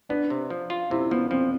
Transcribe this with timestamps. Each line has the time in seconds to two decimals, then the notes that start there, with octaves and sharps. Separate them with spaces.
0.09 B3 D4
0.30 C3
0.50 F3
0.70 F4
0.90 C3 E4
1.11 F3 B3
1.31 F3 C4